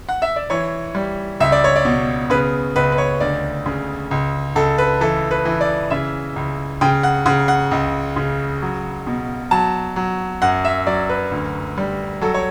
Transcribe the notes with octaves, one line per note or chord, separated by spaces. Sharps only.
F#5
E5
D5
E3 C#5
G3
C#2 E5
D5
C#5
D5
B2
C#3 B4
C#2 B4
B4
C#5
D2 D5
C#3
C#2
C#2 A4
B4
E3 A4
B4
E3
D5
C#3 E5
C#2
C#3 G5
F#5
C#3 F#5
F#5
C#2
C#3
F#3
B2
F#3 A5
F#3
F#2 F#5
E5
F#3 D5
B4
D2
G3
F#3 A4
C#5